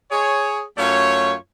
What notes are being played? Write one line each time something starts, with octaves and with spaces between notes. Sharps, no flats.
G#4 C#5
F#2 A3 F4 C#5